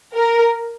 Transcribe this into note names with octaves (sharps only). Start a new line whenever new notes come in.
A#4